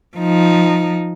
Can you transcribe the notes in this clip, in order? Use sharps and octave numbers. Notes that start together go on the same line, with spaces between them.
F3 D#4